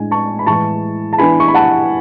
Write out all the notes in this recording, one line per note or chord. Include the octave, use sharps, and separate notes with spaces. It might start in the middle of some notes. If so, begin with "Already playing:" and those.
Already playing: A2 G#3 D4 G#5
A5 C#6
B5
A2 E3 G#3 A5 C#6
A5
E3 B3 D4 G#5 B5
C#6
B5
F#5 A5